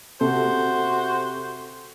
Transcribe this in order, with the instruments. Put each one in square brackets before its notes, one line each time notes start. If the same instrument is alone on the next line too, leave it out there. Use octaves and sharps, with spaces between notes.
[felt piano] C3 [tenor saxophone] F#4 [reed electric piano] A4 [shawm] C5